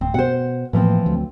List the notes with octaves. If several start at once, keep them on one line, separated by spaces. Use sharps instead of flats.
D1 C4
B2 C5 F#5
A2 E3 F3 A#3 C4
D2 F#3